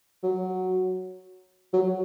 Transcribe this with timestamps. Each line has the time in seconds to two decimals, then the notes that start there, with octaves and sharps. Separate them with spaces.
0.23 F#3
1.73 F#3